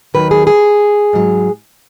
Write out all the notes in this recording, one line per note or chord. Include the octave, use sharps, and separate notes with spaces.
D#2 D#3 F#3 B4
G#4
G#4
G#2 F#3